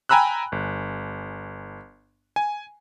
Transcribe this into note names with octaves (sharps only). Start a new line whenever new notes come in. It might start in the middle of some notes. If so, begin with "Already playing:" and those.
G5 G#5 A#5 B5 E6 F#6
G1
G#5